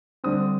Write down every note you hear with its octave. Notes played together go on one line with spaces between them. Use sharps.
D3 G3 C4 D#6